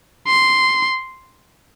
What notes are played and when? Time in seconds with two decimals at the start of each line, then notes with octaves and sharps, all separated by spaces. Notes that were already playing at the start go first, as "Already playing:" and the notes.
0.28 C6